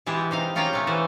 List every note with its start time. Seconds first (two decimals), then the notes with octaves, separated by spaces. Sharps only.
0.06 E3 G#3 B3 G4 G#4 A5
0.31 C3 D#4 F5
0.55 A#3 C#4 F4 A#4 F5 G5
0.73 G#3 A3 C#4
0.87 E3 B4 C5